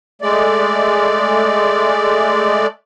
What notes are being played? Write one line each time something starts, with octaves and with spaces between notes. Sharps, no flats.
G#3 A3 D5